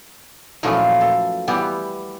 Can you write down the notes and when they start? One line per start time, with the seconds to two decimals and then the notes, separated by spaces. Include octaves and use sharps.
0.63 F#2 A#2 E3 F3 A3
1.00 A4
1.48 E3 G3 B3 G4